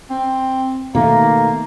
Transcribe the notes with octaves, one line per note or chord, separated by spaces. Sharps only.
C4
B2 D#3 A3 A#3